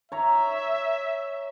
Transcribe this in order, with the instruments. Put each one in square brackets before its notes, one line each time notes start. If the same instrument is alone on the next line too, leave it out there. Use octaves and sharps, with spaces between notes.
[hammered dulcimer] C#5 A#5 [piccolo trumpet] E5